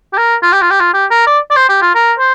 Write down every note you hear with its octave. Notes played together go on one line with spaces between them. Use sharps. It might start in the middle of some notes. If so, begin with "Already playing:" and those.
G4
A#4
F4
G4
F4
G4
F4
G4
A#4
D5
D5
C5
G4
F4
A#4
C5